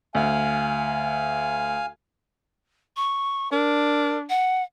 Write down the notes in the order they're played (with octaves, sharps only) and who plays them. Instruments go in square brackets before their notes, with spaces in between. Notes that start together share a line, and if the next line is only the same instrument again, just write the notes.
[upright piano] D2 [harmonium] F5 G#5
[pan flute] C#6
[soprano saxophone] D4 [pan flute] A#4
[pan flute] F#5